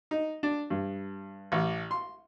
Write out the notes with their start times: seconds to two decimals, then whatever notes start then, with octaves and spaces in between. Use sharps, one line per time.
0.11 D#4
0.43 D4
0.70 G2
1.52 A1
1.91 C6